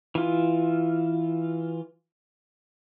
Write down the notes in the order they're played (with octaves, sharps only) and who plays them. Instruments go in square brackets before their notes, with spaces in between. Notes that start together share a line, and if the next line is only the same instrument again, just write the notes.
[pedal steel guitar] E3 F4